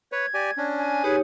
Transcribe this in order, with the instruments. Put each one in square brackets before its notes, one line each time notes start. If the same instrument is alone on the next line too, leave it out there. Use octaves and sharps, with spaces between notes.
[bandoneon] B4 C#5 [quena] G#6
[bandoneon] G4 D5 G#5
C#4 D4
[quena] G#5
[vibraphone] D#4 G4 C#5 [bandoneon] G#4 B4